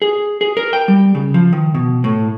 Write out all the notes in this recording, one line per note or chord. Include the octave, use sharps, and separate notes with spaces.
G#4
G#4
A#4
G5
G3
C#3
F3
D#3
B2
A2